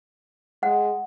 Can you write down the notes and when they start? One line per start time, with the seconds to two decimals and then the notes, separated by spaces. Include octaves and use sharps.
0.63 G#3 F#5